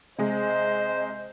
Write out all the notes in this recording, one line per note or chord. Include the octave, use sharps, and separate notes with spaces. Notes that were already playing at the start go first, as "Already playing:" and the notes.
C3 G#3 C5 D#5